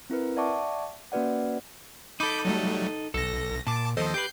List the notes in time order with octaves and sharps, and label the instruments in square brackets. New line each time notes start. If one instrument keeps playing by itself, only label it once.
[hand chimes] C4 E4 A#4 B4
D5 E5 F#5 A5 C#6 D6
A#3 C#4 F#4 B4 D5 F#5
[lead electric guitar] D#4 A4 [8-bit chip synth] B5 D6 G6
[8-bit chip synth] F#3 G3 A3
[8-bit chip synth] B1 A#6 [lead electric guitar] A4
[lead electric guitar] A#2 [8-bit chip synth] A5 D6
[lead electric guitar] D#2 F3 [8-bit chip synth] A4 C5 D#5
[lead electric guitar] G4 B4 [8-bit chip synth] G6 C7